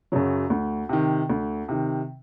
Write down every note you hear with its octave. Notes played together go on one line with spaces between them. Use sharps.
F#2 C#3 F#3
D2
C3 D#3
D2
C3 D#3